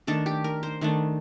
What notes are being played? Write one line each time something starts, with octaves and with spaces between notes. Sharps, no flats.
D#3 A3 D4 A4
G4
A#4
C5
D#3 A3 D4